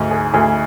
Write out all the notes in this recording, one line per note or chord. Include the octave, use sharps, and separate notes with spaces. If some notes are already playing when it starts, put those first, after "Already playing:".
Already playing: D2 G#2
G#4
D2 G#4